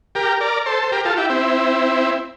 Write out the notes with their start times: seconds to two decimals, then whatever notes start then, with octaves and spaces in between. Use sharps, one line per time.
0.15 G4 A#4
0.40 A#4 D5
0.66 A4 C5
0.83 C5
0.92 G4 A#4
1.05 F4 A4
1.17 E4 G4
1.30 C4 E4